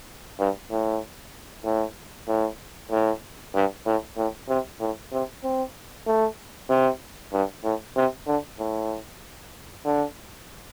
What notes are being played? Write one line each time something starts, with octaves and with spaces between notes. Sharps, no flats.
G2
A2
A2
A2
A2
G2
A2
A2
C3
A2
C3
C4
A3
C3
G2
A2
C3
D3
A2
D3